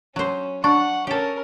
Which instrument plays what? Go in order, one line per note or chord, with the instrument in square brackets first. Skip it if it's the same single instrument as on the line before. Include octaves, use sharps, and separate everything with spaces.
[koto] F#3 C5 [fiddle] C#4
[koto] D4 [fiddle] F#5 [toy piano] C#6
[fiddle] C#4 A#4 [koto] G4 A4